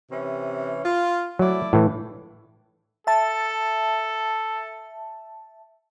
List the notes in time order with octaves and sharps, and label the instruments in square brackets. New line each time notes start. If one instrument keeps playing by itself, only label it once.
[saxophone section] C3 E3 C#4
F4
[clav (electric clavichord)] F#3 [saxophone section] A3 E4 D5
[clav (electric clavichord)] A2 E3
[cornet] A4 [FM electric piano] E5 A5